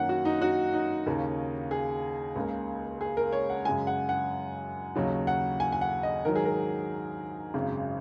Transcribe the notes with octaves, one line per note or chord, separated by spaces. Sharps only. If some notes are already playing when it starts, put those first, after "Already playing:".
Already playing: F#2 D#3 A#3 C#4 F#5
F#4
D#4
F#4
D#4
D#2 C#3 A#3 C#4
G#4
C#2 C#3 A#3
G#4
A#4
C#5
F#5
F#2 C#3 G#3 G#5
F#5
F#5
D#2 C#3 F#3 D#4
F#5
G#5
G#5
F#5
D#5
G#2 D#3 F#3 A#4
G#4
A#4
G#1 F#2 C#3 G#3